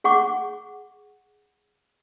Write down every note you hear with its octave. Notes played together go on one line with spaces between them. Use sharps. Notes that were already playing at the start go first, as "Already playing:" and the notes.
G#4 F#5 C#6 D6